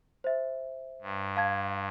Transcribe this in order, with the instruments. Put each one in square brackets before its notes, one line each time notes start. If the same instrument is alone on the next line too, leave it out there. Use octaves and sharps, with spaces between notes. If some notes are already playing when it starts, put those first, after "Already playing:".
[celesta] C5 E5
[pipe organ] G2
[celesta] F5 A5 G#6